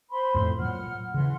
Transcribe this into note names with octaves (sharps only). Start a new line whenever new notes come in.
C5 B5 C6
F2 A2
A#2 F#3 F#5 F6
C#3 E3 F#5 C6 F6